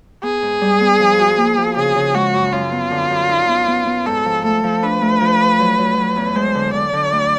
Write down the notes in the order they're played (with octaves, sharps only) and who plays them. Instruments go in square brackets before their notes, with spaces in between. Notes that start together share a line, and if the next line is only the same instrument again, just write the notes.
[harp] B3 [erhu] G#4
[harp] G#2
G3
B3
F3
F#4
A#3
F3
[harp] C#3 [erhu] G#4
[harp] C#3
[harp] G#3 [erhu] F#4
[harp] F#2
[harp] F#2 [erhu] F4
[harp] B3
D3
F#2
D#4
B3
B3
B3
[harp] G#2 [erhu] A4
[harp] F3
[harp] A3 [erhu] A4
[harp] F3
[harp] D4 [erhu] B4
[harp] A3
F3
D4
F#3
F#3
F#3
E2
[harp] G#3 [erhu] C5
[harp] D3
[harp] D3 [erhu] D5
[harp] D3
D2